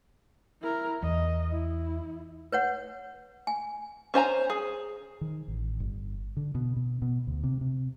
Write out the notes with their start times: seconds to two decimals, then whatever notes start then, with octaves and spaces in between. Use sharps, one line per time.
0.62 E4 A#4
1.03 E2 D#5
1.51 E4
2.52 B4 C#5 F#5
3.47 G#5
4.14 C#4 C5 G#5 A#5
4.50 G#4
5.21 D#3
5.48 A1
5.80 G1
6.37 D3
6.55 B2
6.77 B2
7.02 B2
7.27 D2
7.43 C3
7.61 C3